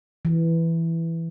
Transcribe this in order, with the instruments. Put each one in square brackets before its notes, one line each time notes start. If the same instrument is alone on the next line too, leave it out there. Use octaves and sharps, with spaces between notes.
[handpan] E3